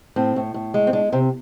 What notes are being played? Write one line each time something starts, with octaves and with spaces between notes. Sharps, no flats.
A2 C4
A2
A2
G#3
C4
G#3 D4
C3 C4